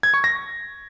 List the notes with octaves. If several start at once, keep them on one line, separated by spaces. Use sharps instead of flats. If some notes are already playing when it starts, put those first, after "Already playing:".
G#6
C#6
A#6